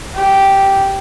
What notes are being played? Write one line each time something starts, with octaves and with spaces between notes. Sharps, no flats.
G4